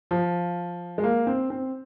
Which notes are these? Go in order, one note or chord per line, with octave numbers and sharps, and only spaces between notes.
F3
G#3
A#3
C4
C4